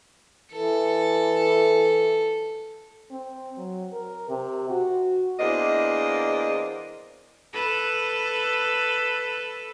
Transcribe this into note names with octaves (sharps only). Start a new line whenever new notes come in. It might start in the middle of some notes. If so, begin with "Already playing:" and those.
E3 A4
C4
F#3
A#4
C3
F#4
E2 A#3 D4 C5 D#5
A4 B4